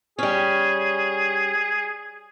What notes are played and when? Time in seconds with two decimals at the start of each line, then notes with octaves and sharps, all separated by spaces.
0.19 G3 C#4 G#4